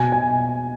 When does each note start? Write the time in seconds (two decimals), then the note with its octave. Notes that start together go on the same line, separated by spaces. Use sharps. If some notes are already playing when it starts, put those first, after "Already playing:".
Already playing: B2 G#5
0.12 G#5